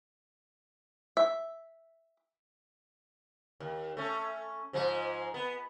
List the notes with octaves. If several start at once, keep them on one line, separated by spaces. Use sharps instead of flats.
E5
D#2
A3 C#4
G#2 F3 G#3
B3